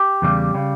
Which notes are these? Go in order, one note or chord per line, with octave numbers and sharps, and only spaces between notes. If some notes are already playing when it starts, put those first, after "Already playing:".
Already playing: G4
E2 C#3 G3
C#3 G3